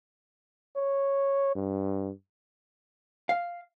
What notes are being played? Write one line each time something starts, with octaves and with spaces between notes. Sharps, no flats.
C#5
G2
F5